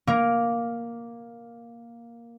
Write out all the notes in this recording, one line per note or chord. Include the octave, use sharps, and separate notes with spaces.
A#3 A#4